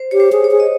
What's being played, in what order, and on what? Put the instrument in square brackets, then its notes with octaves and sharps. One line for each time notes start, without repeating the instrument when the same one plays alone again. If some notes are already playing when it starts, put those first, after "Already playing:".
Already playing: [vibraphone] C5
[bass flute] G4 [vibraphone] C#5
[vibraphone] C5
[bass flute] G#4
[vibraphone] C#5
[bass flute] G#4
[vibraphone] D#5